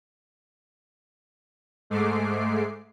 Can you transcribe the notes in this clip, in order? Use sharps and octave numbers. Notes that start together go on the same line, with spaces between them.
G#2 G#3 A3 D6 C7